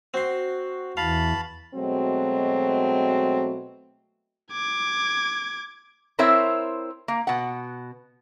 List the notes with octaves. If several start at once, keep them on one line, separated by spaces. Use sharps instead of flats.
C4 F#4 C6
E2 E3 F5 A5 B5
B2 F#3 G#3 A3 C4
D6 G#6
C4 E4 A#4 C5 C#5 E5
A#3
B2 F#5